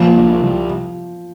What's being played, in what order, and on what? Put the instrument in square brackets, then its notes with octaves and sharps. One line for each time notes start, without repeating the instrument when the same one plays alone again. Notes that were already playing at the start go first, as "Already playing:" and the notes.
Already playing: [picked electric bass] A#2 [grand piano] F3
[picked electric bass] C2
C2